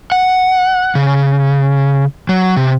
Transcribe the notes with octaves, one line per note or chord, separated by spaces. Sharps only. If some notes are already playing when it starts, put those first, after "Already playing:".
F#5
C#3
F#3
C3